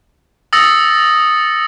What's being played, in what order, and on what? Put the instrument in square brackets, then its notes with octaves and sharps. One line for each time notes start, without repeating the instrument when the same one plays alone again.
[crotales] D#6 E6 A6 A#6 C#7